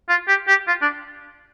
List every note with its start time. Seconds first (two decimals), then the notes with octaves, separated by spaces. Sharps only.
0.09 F4
0.28 G4
0.48 G4
0.67 F4
0.82 D4